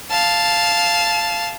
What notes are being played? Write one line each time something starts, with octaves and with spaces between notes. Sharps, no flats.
F5 A5